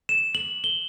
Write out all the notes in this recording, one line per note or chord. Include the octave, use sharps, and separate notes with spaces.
E7
F#7
G7